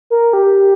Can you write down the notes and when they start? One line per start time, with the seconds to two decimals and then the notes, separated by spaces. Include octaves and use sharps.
0.10 A#4
0.33 G4